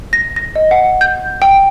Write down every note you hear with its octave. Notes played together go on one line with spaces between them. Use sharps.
A#6
A#6
D#5
F#5
G6
G5